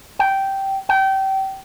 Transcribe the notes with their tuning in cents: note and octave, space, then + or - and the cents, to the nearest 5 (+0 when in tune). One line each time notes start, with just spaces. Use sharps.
G5 -10
G5 -25